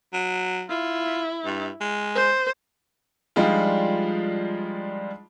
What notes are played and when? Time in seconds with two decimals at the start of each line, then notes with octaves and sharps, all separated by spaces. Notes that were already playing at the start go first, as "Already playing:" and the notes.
0.13 F#3
0.70 E4 F4
1.46 G2
1.81 G#3
2.15 C5
3.36 F3 G3 G#3 D4 D#4 F4